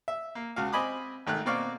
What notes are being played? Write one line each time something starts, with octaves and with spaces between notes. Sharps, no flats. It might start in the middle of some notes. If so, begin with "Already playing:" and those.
E5
A#3
C#2 F#4 F5
C4 D#5 G#5 B5 D6 D#6
G#1 D#3 A3 F#6
B2 A#3 C4 D5 F5 C#6